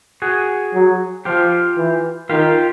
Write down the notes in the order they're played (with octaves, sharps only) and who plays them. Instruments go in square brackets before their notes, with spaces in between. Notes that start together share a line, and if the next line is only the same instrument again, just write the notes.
[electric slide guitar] F#4 G#4
[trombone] F#3
[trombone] F3 [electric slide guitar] F4 G4
[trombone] E3
[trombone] D#3 [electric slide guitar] F4 G4